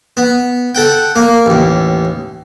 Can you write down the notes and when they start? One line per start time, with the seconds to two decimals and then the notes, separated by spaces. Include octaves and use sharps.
0.17 B3
0.75 A4 F#5 G5
1.16 A#3
1.46 A1 D#2